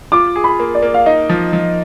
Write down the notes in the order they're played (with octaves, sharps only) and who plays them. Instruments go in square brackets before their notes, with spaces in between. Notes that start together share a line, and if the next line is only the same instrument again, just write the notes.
[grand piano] F4 [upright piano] D6
[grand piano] G#4
[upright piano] B5
[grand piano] A#3
[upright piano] D5
[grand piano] A#3
[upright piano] F5
[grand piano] D#4 [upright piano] D#5
[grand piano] F3
F3